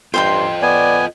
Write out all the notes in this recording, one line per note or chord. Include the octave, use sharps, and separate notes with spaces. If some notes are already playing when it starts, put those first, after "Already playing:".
G2 F4 A4 C5 D#5 G5 C6
B3 D5 G#5